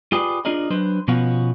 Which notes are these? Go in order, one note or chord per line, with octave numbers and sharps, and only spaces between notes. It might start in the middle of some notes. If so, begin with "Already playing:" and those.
F4 G4 G#4 B4 D5
D4 F4 G#4 A#4 D5 D#5
F#3 D4 B4 C5
B2 F3 B3 C#4 F4 F#4